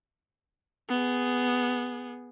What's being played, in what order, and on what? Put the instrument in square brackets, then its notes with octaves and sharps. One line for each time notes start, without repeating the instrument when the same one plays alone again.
[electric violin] B3 G#4